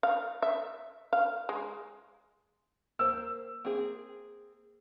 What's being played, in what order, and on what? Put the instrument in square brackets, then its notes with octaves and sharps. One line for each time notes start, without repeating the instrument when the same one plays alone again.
[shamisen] F5
E5
F5
G#3
[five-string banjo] A#3 C5 [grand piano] E6
[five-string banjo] A#3 C4 G#4